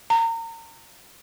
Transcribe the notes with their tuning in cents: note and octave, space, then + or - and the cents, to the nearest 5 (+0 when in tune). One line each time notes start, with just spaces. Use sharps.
A#5 -30